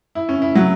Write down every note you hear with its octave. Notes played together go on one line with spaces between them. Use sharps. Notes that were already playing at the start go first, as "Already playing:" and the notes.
E4
C#4
E4
F#3